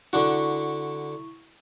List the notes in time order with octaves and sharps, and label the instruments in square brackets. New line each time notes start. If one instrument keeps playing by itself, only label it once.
[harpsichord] D3 D4 F#4 [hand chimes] E4 C#6